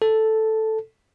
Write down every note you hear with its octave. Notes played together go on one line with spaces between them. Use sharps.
A4